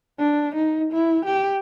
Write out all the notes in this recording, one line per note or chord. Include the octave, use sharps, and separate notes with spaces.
D4
D#4
E4
G4